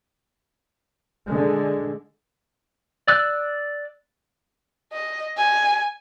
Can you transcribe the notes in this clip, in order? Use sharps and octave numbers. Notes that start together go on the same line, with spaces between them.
D3 G#3
D5 E6 F#6
D#5
G#5